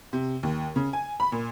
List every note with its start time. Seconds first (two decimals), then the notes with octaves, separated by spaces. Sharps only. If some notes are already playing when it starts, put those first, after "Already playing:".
0.13 C3
0.43 D#2
0.76 C#3
0.93 G#5
1.20 B5
1.32 A#2